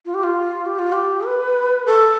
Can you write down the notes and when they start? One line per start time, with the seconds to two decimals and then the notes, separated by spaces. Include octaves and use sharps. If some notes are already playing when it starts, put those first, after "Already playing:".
0.06 F4
0.14 G4
0.24 F4
0.66 G4
0.79 F4
0.92 G4
1.26 B4
1.86 A4